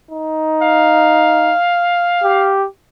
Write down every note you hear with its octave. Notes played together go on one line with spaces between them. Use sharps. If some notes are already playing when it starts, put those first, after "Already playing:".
D#4
F5
G4